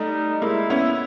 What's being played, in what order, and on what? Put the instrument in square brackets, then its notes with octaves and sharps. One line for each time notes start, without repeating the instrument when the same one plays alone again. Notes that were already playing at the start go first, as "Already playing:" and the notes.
Already playing: [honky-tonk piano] G3 A3 [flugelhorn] D#4
[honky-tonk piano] G#3 A#3 [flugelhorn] E4
[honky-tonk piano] B3 C#4